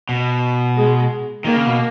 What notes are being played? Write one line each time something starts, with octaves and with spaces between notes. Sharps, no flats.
B2
G#3
D#3 A#3
C#3
B2